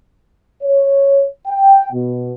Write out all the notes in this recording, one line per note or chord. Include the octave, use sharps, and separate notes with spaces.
C#5
G5
B2